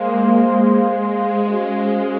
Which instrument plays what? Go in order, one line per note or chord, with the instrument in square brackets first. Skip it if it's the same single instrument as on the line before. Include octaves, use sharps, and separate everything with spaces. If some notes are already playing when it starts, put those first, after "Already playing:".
Already playing: [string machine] G#3 A#3 [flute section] C5 F5 C6
[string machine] G#3
G#3
[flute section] C#4 F#4 C5 F5